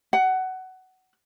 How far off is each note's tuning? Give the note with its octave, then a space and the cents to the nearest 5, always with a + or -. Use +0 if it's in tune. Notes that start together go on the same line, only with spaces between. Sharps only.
F#5 +15